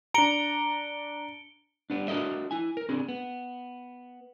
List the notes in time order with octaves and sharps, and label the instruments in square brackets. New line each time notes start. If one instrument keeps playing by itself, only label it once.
[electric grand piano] D4 A#5 [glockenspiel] C#7 D7 G7
[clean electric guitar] G3 B3 D4
D4 F#4 A4 A#4 D#5 E5
E4 G#5
A#4
C4 D4 G#4
B3